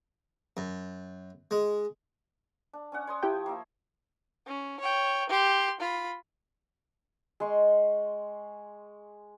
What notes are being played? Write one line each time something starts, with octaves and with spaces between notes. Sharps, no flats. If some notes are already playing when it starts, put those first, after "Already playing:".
F#2
G#3
D4
C#4 D4 F#5
C#5 C6 D#6
F3 E4 G4 G5
A#3 E5
C#4
C#5 G5
G4 C6
F4 B5
G#3 C6 C#6